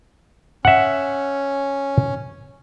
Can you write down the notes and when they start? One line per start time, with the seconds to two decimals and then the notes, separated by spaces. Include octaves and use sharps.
0.65 C#4 E5 F#5